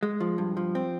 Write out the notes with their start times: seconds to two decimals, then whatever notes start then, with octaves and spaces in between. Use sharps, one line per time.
0.03 G#3
0.20 F3
0.38 G2
0.57 F3
0.75 C4